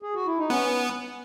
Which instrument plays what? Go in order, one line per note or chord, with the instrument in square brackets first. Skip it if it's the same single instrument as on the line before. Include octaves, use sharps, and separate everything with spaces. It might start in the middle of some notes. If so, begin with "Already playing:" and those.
[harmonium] G#4
F#4
E4
D#4
[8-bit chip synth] B3 [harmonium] C#4